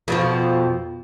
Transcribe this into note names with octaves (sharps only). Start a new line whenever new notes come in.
F2 B2 F3